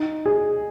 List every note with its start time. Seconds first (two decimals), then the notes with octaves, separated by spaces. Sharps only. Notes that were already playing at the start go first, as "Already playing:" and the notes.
Already playing: D#4
0.26 G#4